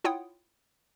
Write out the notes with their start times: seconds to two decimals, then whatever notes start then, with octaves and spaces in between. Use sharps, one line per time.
0.04 E4 F4 C#5 F#5 G5 D#6